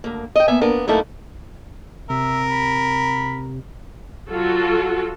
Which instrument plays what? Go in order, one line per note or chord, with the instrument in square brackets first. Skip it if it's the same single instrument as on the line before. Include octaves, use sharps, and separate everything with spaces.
[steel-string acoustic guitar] D2 A#3
D#5 G5
A#3 B3 E5 G#5
A#3 B3 D4 A#4
F#2 A3 A#3 D#4 E4
[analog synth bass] C3 [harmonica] A#4 [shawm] E5
[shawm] B5
[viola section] F#3 F4 F#4 A4